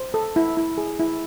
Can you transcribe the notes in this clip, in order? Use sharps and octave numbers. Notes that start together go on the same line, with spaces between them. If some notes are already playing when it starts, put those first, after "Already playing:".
Already playing: C5
A4
E4
E4
G#4
E4